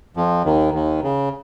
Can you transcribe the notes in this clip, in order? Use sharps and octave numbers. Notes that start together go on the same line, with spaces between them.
F2 F3
D#2 D#3
D#2 D#3
C#3